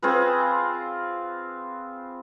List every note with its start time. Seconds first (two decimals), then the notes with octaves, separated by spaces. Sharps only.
0.02 C4 F4 G#4 B4